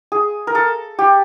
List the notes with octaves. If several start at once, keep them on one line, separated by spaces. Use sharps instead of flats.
G#4
A#4
A4
G4